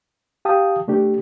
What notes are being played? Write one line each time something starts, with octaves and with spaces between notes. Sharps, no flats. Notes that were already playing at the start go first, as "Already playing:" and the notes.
G4 F5 G5 A5 D#6
C3 A3 D4 G4